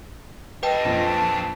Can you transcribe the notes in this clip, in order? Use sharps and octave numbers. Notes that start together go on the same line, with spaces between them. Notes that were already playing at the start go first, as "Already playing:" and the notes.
G4 A4 B4 D#5 G5
A#1 F2 F4 A4
A5